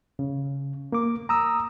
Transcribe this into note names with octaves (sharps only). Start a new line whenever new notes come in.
C#3
A#3 D6
A#5 D#6 E6